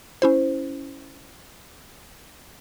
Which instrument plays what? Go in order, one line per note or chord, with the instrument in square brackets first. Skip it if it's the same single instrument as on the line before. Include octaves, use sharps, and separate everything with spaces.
[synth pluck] C#4 E4 C5